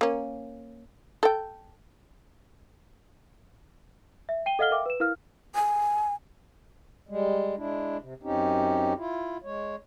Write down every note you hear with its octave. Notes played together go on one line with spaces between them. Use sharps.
A#3 C#4
A4 G5
E5
G5 D#7 G7
A4 D#5 F5 F#5 F6 G7
A#4 E5 F5 G5 D6
B4 E7
E4 A#4 F5 F6
G#5
G3 G#3
G#3 D4 E4
C3
F#2 C4 C#4 D#4 G4
E4 F4
G#3 C#5